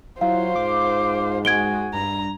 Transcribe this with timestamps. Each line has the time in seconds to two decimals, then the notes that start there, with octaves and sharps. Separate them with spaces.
0.21 F#3 E4 F4 C5 F5
0.56 G#2 D6
1.45 G#3 F#4 G#4 G#6 D7 G7
1.94 G2 A#5